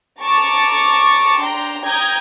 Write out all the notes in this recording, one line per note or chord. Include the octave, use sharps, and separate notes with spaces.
A5 A#5 C#6 D6 A6
D4 G5 A#5 C6
G5 A#5 D#6 G6 G#6